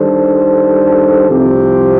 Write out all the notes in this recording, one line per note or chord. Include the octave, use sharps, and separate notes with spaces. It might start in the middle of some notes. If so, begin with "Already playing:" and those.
Already playing: D#3 G3 D4 A4 C5
C2 C3 F3 C4 G4